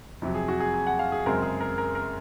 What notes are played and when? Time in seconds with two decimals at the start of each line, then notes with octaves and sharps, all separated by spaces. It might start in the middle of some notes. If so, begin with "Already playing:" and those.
0.22 F2 C3 F#3
0.34 G#4
0.48 F#4
0.60 G#4
0.74 G#4
0.87 F#5
0.99 F5
1.12 G#4
1.26 F#2 C#3 G#3 C4 A#4
1.42 G#4
1.61 A#4
1.78 A#4
1.95 A#4